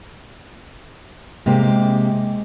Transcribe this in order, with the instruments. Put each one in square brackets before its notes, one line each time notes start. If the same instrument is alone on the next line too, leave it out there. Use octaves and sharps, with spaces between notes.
[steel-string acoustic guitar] C3 A#3 G4 [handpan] G#3